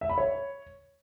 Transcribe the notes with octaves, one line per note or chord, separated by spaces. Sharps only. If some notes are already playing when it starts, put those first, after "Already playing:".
E5
B5
C#5